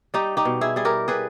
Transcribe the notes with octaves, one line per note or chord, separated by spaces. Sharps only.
G3 D#4 G4
D#4 G4
B2
E4 G#4
G3 G#4
G4 A#4
G3 G#4 B4